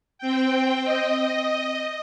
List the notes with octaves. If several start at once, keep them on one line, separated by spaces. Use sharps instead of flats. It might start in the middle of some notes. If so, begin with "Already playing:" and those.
C4 G5
D#5